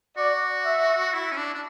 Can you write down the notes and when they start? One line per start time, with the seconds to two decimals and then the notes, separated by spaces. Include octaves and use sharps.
0.17 F#4 D5
0.65 E5
1.13 E4
1.32 C#4
1.37 D4
1.54 D4